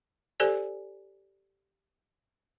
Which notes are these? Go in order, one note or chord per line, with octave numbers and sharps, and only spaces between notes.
G4 A4 C5 D5 G#5